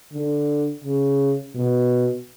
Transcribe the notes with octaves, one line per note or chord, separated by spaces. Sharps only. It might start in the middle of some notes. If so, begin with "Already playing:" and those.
D3
C#3
B2